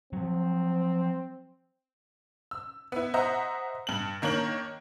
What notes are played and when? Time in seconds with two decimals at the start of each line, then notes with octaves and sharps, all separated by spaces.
0.13 F3 F#3 C4
2.51 E6
2.92 B3 E4
3.14 C5 D#5 E5 F#5 A#5
3.87 G2 F#7
4.22 D#3 A#3 D4 C#5 F#7